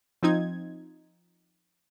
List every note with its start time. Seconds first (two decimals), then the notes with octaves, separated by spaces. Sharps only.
0.23 F3 C4 D#4 G#6